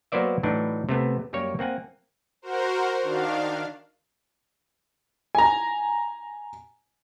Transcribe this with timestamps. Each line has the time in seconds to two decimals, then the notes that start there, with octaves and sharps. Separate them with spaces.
0.12 F#3 A#3 B3 C5 D5 E5
0.43 A2 E3 F#3 D4 D#4
0.89 C3 A3 B3
1.33 F#2 G3 A#3 C#5
1.59 A#3 C4 F#5 G#5
2.42 F#4 A#4 C5
3.03 D#3 D4 F5
5.35 G#5 A#5